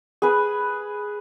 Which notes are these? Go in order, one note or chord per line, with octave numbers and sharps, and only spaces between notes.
G#4 B4